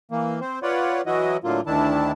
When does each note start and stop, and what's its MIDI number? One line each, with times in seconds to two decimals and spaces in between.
0.12 0.40 52
0.12 0.40 58
0.41 0.59 60
0.41 0.59 72
0.63 1.01 65
0.63 1.01 71
0.63 1.01 73
0.63 1.01 74
0.63 1.01 78
1.06 1.37 52
1.06 1.37 54
1.06 1.37 64
1.06 1.37 66
1.06 1.37 75
1.44 1.61 45
1.44 1.61 50
1.44 1.61 54
1.44 1.61 58
1.44 1.61 65
1.66 2.12 38
1.66 2.12 51
1.66 2.12 62
1.66 2.12 64
1.66 2.12 81